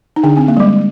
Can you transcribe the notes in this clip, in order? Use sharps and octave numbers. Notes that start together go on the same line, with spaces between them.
D#4
D3 D4
C4
A#3
G3
G#3